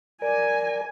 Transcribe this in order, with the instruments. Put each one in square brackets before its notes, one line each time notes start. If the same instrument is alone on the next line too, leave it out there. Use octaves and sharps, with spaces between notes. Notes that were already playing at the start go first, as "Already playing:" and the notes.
[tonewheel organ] A#4 D5 [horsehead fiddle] G#5